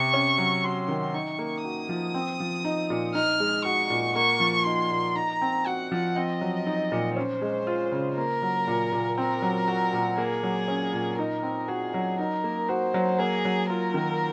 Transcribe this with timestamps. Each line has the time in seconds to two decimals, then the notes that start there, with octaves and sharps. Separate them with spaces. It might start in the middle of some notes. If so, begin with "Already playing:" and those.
Already playing: C3 C#6
0.14 C#4
0.38 F#3
0.64 F#4 C6
0.88 D#3
1.14 D#4 C#6
1.39 A#3
1.64 F#4 D#6
1.89 F3
2.14 C4
2.40 F3
2.65 D#4
2.90 A#2
3.15 D#4 F6
3.40 G#3
3.65 F#4 C#6
3.90 A#2
4.15 A#3 C#6
4.40 F3
4.65 D#4 C6
4.91 A#2
5.16 D#4 A#5
5.42 C4
5.66 F#4 F#5
5.92 F3
6.16 C4 D#5
6.41 F#3
6.67 D#4
6.92 A#2
7.17 C#4 C5
7.42 G#3
7.67 F4
7.92 C#3
8.17 A#3 A#4
8.42 F#3
8.67 A#2
8.92 A#2
9.18 C4 A#4
9.42 F#3
9.68 F#4
9.93 A#2
10.18 A#3 G#4
10.43 F#3
10.68 C#4
10.93 A#2
11.19 D#4 A#4
11.43 C4
11.68 F#4 G#4
11.94 F#3
12.19 D#4 A#4
12.44 A#3
12.69 F#4 C5
12.94 F#3
13.19 A#3 G#4
13.45 F#3
13.69 F4 A#4
13.94 D#3